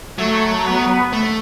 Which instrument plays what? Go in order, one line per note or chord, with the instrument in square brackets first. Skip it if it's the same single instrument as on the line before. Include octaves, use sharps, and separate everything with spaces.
[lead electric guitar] F#3 [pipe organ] A3 A4
[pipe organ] B3 B4
[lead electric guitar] A3